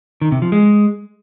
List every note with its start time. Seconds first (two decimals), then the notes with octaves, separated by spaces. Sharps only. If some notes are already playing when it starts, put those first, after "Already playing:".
0.22 D#3
0.32 C3
0.42 F3
0.52 G#3